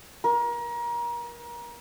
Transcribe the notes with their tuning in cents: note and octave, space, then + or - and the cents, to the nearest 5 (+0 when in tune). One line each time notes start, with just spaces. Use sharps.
A#4 +30